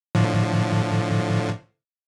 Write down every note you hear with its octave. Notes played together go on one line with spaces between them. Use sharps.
A2 D3 F3